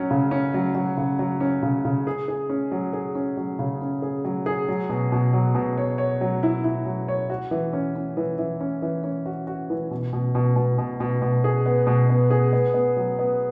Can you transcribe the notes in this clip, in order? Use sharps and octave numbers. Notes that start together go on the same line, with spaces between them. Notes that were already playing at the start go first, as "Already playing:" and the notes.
Already playing: F#3 C#4
C#3
C#4
F#3
F#3
C#3
F#3
C#4
C#3
C#3
G#4
G#4
C#4
F#3
G#4
C#4
F#3
C#3
C#4
G#4
F#3
G#4
F#3
B2
B2
F#3
B2
C#5
C#5
F#3
E4
E4
F#3
C#5
F#4
E3
C#4
C#4
E3
E3
C#4
E3
C#4
F#4
F#4
E3
B2
B2
B2
B2
B2
B2
B2
G#4
B3
B2
B3
G#4
B3
B3
F#3
B3